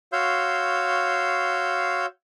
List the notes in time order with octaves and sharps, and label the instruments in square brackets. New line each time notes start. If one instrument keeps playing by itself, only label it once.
[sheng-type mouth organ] F#4 C#5 F5 C6 E6 G6